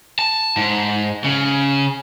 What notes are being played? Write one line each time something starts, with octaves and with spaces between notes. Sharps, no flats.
A5
G#2
C#3